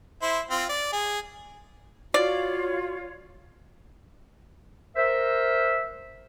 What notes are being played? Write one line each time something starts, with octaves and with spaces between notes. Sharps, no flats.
E4 C5
C4 F4
D5
G#4
F4 F#4 C#5 D5
A#4 C5 E5